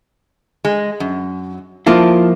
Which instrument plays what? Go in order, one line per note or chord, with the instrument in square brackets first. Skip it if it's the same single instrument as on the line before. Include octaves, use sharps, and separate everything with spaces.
[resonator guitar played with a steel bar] G#3
F#2
[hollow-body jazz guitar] F3 A#3 E4 [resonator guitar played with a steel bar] F4 A5